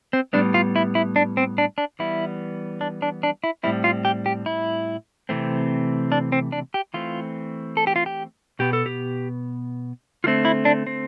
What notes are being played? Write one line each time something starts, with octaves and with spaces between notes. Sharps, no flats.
C4
A2 G3 B3 D4
F4
E4
E4
D4
C4
D4
D4
E3 G3 B3 E4
D4
D4
D4
E4
A2 G3 C4 E4
F4
G4
G4
E4
C3 E3 A3 C4
D4
C4
D4
G4
E3 A3 C4 F4
A4
G4
F4
G4
B2 B3 G4
A4
G4
D3 A3 C4 F4
E4
D4
C4